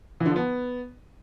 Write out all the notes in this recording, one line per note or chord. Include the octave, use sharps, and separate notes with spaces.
E3
D3
F3
B3